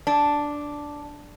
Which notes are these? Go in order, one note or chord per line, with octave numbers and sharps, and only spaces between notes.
D4